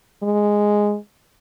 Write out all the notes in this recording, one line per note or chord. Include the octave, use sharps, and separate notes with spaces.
G#3